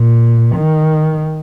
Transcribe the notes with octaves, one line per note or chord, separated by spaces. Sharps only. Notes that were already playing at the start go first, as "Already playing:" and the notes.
Already playing: A#2
D#3